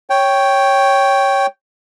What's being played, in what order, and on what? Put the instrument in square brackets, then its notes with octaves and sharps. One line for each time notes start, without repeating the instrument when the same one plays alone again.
[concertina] C#5 G5